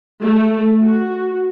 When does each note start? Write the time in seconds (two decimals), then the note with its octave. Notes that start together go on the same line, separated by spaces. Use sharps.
0.22 A3
0.82 F#4